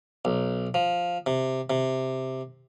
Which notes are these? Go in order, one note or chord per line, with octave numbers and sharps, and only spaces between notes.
B1
F3
C3
C3